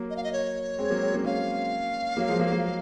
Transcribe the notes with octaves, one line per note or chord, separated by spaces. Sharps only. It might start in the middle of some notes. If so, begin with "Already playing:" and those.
Already playing: F#3 A#3
D#5
F5
D#5
C#5
G#3 C4
F#3 A#3
G#3 C4
A#3 C#4
A#3 C#4 F5
F#3 A#3
F3 G#3
F#3 A#3
F#3 A#3